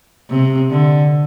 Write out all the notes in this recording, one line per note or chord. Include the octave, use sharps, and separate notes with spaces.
C3
D3